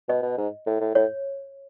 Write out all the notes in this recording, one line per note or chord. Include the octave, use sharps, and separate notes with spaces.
B2 D#5
B2
G#2
A2
A2
A2 C#5